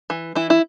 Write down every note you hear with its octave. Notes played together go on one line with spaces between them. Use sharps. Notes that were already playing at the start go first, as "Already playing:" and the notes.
E3
E3 E4
E4